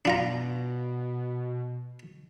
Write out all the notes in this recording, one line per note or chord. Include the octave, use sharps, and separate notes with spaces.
B2 D4 F4 A#5